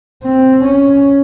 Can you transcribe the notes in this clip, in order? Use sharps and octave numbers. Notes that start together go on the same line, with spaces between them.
C4
C#4